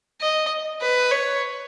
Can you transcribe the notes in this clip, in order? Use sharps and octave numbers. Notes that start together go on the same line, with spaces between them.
D#5
B4
C#5